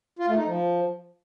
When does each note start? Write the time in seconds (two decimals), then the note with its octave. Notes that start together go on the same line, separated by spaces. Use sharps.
0.19 F4
0.28 A3
0.37 D#4
0.46 F3